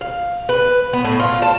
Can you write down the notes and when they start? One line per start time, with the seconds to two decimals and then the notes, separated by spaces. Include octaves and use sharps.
0.01 F5
0.49 B4
0.93 B3
1.04 A2
1.20 F4
1.42 A5